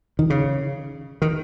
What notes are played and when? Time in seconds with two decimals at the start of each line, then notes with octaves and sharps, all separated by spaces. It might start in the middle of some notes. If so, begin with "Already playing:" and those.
0.19 D#3
0.30 C#3
1.22 D#3